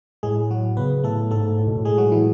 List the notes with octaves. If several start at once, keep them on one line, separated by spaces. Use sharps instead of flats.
A2 G#3 G#4
F#3 F#4
C#3 B3 B4
A2 A3 A4
G#2 A3 A4
A2
B2
A2
G#3 G#4
F#3 F#4
E3 E4